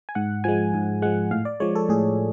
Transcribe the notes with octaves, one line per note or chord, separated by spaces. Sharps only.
G#5
G#2 F#5
F3 G#3 G#5
G#2
F3 G#3 F#5
A2 F5
D5
F3 G#3 C#5
A4
A2 G#4